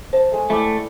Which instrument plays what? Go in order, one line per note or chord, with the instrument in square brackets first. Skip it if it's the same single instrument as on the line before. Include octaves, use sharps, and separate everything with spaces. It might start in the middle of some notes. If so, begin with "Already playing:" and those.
[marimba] C5 [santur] A5
[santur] G#3 A3
[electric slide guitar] A3 [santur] E4 D5 G5